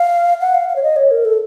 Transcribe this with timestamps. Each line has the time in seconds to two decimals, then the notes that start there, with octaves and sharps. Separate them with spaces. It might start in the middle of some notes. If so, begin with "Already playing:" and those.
Already playing: F5
0.41 F#5
0.54 F5
0.69 F5
0.76 C#5
0.83 D#5
0.96 C#5
1.11 A#4
1.25 A4